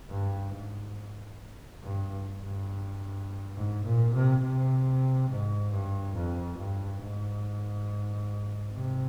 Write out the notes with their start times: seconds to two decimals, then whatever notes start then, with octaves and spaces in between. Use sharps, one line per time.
0.10 G2
0.54 G#2
1.83 G2
2.42 G2
3.56 G#2
3.85 A#2
4.14 C3
4.42 C3
5.30 G#2
5.72 G2
6.16 F2
6.58 G2
7.02 G#2
8.74 C3